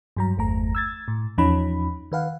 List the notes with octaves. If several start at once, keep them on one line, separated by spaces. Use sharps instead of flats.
G2 F#3 A#5
G1 E2 A3 A#5
E6 G#6 A6
A2
E2 F3 C#4 D#4 B5
D#3 B4 F5 F#5